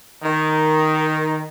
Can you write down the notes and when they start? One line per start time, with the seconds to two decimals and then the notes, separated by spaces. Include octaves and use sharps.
0.24 D#3